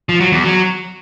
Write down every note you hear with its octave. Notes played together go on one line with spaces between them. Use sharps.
F3
F#3
E2
F#3